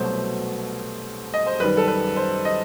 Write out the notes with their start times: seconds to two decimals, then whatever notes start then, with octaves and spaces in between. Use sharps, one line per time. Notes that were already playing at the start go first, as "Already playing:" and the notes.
Already playing: C2 B2 F#3 A3 C5
1.34 D#5
1.47 C5
1.59 F#2 D#3 G3 B4
1.77 A4
1.88 B4
2.16 C5
2.45 D#5